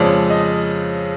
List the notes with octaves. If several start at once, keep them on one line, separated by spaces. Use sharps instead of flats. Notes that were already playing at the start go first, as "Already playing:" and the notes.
Already playing: F2 C#3 F3 G#3 D5
D#5